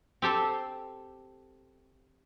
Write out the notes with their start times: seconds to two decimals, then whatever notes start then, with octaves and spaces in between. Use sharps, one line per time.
0.22 C4 G4 A4 C5